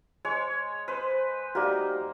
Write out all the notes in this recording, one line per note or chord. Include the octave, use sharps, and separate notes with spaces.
G#3 C#5
B4 C5
A#3 D#4 F#4 G4 D5